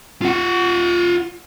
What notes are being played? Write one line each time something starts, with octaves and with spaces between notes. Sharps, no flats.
F4 F#5